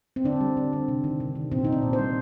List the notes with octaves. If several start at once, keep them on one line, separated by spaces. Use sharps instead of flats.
C4
D3 D4
G3
D3
C4
C3
D#3
C3
D#3
A#2 C4
A#2 D#4
D4
A#2
C5
G3